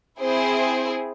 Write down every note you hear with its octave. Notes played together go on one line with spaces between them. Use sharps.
C4 E4 G#4 C5